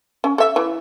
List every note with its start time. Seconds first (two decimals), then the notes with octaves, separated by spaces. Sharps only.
0.24 C#4
0.38 A4 E5
0.56 E3